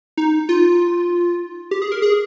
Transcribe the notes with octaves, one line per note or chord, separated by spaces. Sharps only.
D#4
F4
G4
G#4
A#4
G#4